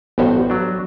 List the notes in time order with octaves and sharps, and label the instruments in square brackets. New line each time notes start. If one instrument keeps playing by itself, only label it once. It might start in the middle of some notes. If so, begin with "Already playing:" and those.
[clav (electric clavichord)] A1 G2 [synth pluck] B3 F#4 C5
[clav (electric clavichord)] F#3 D4